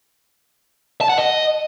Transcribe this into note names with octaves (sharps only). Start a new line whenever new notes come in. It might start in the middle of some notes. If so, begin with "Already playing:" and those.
A5
F#5
D#5